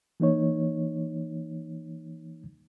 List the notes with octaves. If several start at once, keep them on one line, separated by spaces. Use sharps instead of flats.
E3 A#3 D#4 C#5